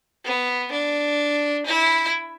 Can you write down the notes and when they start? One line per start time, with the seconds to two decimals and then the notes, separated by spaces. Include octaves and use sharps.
0.24 B3
0.72 D4
1.66 E4